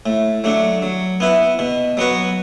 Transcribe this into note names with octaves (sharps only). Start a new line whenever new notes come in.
A2
F#3 A3 D4
F#3
B3 E4 B4
B2
F#3 B3 F#4 B4